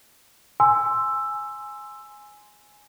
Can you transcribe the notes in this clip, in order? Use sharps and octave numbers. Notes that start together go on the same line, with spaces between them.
G#5 C6 E6